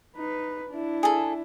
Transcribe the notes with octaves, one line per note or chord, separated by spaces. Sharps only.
D#4 B4
D4 E4
G#4 A4